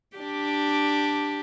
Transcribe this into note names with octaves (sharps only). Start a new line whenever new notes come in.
D4 G4